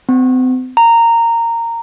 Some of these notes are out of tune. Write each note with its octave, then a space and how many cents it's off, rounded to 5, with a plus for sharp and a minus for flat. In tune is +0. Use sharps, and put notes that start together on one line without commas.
C4 -40
A#5 -15